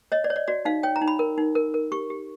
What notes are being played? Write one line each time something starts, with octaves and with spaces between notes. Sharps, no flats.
C#5 D#5
D5
C#5
D5
F#4 D5
D#4 F5
C#5 G5
A#5
D#4
B5
A#4
D#4
A#4
A#4
G4 C#6
G4